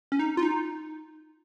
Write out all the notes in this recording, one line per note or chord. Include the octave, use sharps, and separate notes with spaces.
C#4
D#4
F4
D#4